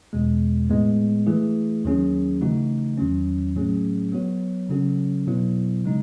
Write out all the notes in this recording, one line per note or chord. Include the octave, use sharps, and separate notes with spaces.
E2 B2 G#3
A2 G#3 B3
E3 A3 E4 G#4
D#2 D#3 F#3 C#4 G#4
C#3 E3 A3 D#4 F#4
E2 D#3 F#3 C#4
A2 F#3 A3 C#4 G#4
F#3 B3 F#4 C#5
C#3 F#3 C#4 F#4 A4
B2 F#3 B3 E4
C#3 G#3 D#4